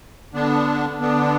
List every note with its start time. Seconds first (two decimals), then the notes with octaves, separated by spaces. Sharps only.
0.34 D3 B3 D4
0.99 D3 B3 D4